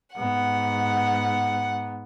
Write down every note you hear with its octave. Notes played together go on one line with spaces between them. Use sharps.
G#2 B3 F#5